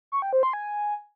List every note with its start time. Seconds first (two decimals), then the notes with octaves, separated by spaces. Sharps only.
0.12 C#6
0.22 G5
0.33 C5
0.43 C6
0.53 G#5